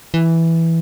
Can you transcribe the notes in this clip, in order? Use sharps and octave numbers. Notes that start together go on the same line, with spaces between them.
E3